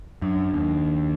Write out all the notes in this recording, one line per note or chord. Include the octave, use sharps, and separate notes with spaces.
F#2 D4
D#2